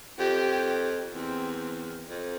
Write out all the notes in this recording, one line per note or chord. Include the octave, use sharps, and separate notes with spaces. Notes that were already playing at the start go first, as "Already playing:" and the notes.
F2 G4
E2 C4
F2